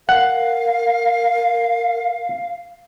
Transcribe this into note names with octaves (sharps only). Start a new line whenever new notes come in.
A#4 F5 F#5